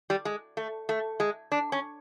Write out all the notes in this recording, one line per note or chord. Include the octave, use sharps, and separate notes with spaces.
G3
G#3
A3
A3
G#3
D4
C#4